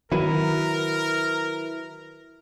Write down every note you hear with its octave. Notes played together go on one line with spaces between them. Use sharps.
D#3 F#3 E4 A#4 B4